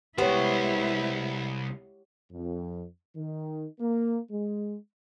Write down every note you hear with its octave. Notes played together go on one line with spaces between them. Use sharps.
C2 G#3 B3 E4 G4 C5 C#5
F2
D#3
A#3
G#3